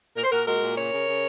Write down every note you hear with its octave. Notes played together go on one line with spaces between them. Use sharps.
A#2 A#4
C5
A#2 F#4 A#4
G#3 F#4 A#4
A#2
C#3 A#4 C#5
C#3
C#3